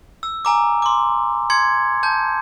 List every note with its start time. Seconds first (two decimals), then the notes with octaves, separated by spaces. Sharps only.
0.23 E6
0.45 G#5 A#5 D6
0.82 C6 D6
1.50 C6 G#6 C#7
2.03 A5 G6